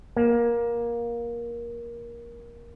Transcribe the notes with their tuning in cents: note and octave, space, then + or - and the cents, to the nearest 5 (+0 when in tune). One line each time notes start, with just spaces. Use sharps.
A#3 +15